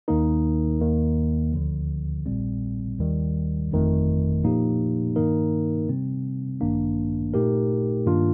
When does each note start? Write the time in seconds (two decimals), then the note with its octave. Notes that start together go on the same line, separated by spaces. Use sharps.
0.08 D#2 D#3 A#3 D#4 A#4
0.80 D#2 D#3 A#3
1.52 D2 D3 F3
2.26 A#1 A#2 G3 C4
2.99 D#2 D#3 G3
3.71 G1 F2 D#3 A3
4.43 A#2 F3 A#3 D#4 G4
5.16 G2 D#3 A#3 D#4 A#4
5.88 C3 G3 C4
6.61 A1 G2 D#3 A#3 D4
7.34 A#2 A3 D#4 G4 A#4
8.06 G2 D#3 A#3 D4 F4